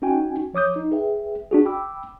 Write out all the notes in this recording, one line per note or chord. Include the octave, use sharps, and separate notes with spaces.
C#4 D#4 F#4 G5 G#5
F3 C#5 D6 D#6 G6
D#4
G#4 B4 E5 G5
D4 F#4 G#4
G5 B5 D6 E6